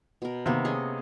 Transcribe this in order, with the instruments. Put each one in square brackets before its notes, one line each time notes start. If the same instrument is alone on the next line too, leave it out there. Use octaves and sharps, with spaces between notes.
[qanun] B2 A#4
[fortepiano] C3 [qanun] D#3 A#3 B3
[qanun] C#4 G#4 D#5